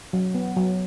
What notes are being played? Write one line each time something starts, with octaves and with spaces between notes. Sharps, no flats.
F#3
B3
F#3